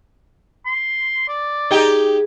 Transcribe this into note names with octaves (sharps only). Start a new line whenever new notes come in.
C6
D5
D#4 G4 G#4